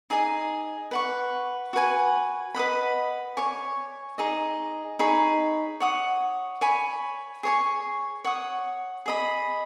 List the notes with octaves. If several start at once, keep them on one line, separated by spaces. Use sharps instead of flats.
D#4 G#4 D#5 G#5
B4 F#5 C#6
F#4 B4 G#5
B4 D#5 F#5 B5
C#5 G#5 C#6
D#4 G#4 D#5
D#4 G#4 C#5 B5
C#5 F#5 D#6
C#5 G#5 B5
G#4 C#5 G#5 C#6
C#5 F#5 D#6
G#4 D#5 B5